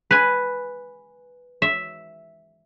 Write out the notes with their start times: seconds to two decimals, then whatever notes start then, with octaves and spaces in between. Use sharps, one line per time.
0.11 B4 G#5
1.62 E5